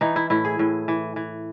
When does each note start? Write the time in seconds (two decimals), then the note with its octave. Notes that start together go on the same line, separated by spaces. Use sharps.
0.01 E3 D#4
0.16 E4
0.30 A2 E4
0.45 G#4
0.59 A2
0.88 E3
1.16 E3